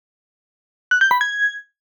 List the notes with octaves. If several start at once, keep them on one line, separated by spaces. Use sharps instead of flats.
F#6
G6
B5
G#6